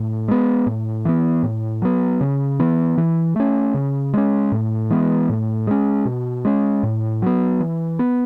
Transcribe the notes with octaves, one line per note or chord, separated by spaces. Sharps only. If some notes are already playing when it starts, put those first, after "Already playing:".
Already playing: A2
G#3 B3
A2
E3 B3
A2
F#3 B3
C#3
E3 B3
E3
A3 C#4
C#3
G#3 C#4
A2
E3 G#3 B3
A2
G#3 C#4
B2
G#3 C#4
A2
F#3 B3
E3
B3